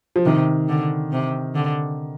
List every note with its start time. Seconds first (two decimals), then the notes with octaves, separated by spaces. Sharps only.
0.16 F3
0.25 C3 D#3
0.69 D3
1.12 C3
1.55 D3